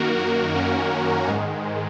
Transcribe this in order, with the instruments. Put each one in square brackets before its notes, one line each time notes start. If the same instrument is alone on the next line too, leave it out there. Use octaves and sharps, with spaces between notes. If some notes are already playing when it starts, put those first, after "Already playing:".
Already playing: [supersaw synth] F#2 D#3 A#3 F#4 A#4
F#4 A#4
C#4
G#2 D#3 G#3